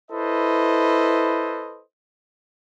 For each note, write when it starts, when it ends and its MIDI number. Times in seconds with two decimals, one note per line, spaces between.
0.10 1.81 64
0.10 1.81 69
0.10 1.81 71
0.10 1.81 72
0.10 1.81 75